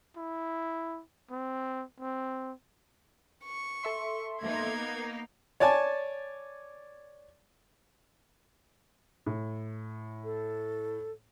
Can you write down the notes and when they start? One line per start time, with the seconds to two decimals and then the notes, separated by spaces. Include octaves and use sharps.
0.17 E4
1.30 C4
2.00 C4
3.45 C#6
3.83 A4 E5 C6
4.42 A#3 B3 D#4 G#6
5.60 C#5 D5 G#5 A5
9.26 A2
10.24 A4